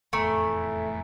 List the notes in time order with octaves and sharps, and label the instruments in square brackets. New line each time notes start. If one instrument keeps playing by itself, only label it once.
[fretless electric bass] F1 [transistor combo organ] E2 A2 [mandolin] A3 [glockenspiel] G#5 A#5 D7